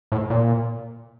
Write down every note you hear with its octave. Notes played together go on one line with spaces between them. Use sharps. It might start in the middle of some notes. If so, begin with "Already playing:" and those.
A2
A#2